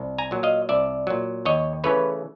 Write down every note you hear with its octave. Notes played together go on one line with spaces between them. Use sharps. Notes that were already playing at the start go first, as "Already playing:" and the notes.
Already playing: C2
G#5 A#5
A#2 F#3
D#5 F5
C2 D5 E5
A#2 F#3
D#2 C#5 D#5
C#3 E3 A3 C#4 B4 C#5